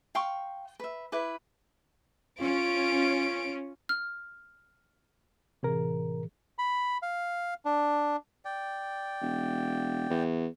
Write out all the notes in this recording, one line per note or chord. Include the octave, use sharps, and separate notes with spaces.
F5 G5 C6 C#6
B4 E5
E4 B4 D6
C#4 F4 D7
F6
A2 C3 E3 G#4 A#4
B5
F5
D4
D5 G5
E1
E2